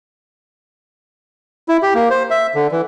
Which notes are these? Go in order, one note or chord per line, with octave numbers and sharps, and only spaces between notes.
E4
G4
A#3
C5
E5
D3
E3